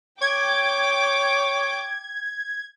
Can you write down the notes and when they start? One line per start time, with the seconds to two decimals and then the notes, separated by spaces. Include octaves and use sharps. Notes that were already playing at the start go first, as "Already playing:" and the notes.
0.22 C#5 G5 D6 G#6